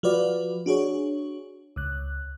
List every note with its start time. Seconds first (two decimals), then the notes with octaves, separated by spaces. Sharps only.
0.03 F3 F4 F#4 B4 D5
0.66 D4 F#4 G#4 C#5
1.76 C#2 F#6